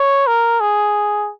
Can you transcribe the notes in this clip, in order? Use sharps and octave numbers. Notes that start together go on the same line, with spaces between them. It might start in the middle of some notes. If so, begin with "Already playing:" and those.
Already playing: C#5
A#4
G#4